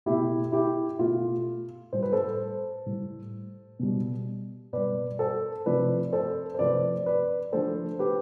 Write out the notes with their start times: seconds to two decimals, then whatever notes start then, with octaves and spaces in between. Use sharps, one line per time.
0.06 B2 A3 E4 G4
0.52 E4 G4
0.99 B2 A3 F4
1.93 A2 G3 C5
2.03 B4
2.12 A4 C5
2.86 A2 G3
3.79 B2 G3
4.73 B2 G3 B4 D5
5.19 A4 C5
5.66 C3 F3 A3 B4 D5
6.13 A4 C5
6.54 C5
6.59 C3 F3 A3 B4 D5
7.06 B4 D5
7.53 D3 F3 A3 A4 C5
7.99 G4 B4